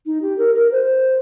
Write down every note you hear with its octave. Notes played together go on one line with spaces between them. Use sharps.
D#4
G4
A#4
A#4
C5